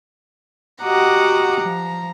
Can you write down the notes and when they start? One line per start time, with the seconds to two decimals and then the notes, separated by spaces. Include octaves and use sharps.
0.82 F#4 G4 D#5 F#5 A#5 D6
1.58 F3 A#5